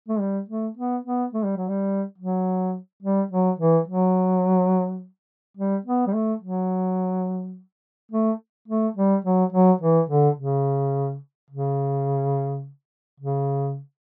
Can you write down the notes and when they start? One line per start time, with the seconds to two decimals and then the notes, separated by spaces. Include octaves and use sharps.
0.09 A3
0.20 G3
0.49 A3
0.77 B3
1.05 B3
1.34 A3
1.45 G3
1.57 F#3
1.69 G3
2.18 F#3
3.03 G3
3.31 F#3
3.59 E3
3.88 F#3
5.57 G3
5.86 B3
6.07 G3
6.14 A3
6.42 F#3
8.12 A3
8.68 A3
8.97 G3
9.25 F#3
9.53 F#3
9.81 E3
10.09 D3
10.38 C#3
11.51 C#3
13.20 C#3